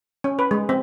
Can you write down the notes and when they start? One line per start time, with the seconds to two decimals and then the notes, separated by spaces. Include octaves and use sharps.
0.24 C#4
0.39 B4
0.51 G#3
0.69 C4